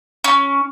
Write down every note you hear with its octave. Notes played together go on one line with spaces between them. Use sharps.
C#4